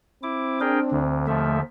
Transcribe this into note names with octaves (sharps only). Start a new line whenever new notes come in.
C4 E4 D6
D4 G#4 A#4 G5
D2 D3
D#2 F3 A3 E5